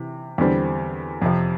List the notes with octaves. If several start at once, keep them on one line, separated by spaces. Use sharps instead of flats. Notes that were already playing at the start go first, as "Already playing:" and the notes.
Already playing: C3 E3
E2 D3 G3 C4
F2 C3 F3